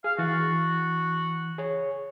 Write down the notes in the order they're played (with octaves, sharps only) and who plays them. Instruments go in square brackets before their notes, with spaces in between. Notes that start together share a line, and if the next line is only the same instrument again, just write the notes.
[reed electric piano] G#4 [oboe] F5
[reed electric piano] E3 A6 [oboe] F#4
[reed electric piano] G#4 C#5